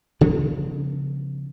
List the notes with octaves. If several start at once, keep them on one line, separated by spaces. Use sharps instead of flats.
C#3 F3 G3 B3